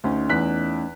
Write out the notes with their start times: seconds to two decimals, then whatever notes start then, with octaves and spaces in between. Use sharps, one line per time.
0.04 D2 A3 C#4 D#4
0.29 E2 F#6 B6